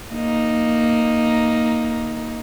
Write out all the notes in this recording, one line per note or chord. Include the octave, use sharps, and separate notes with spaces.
A#3 D#4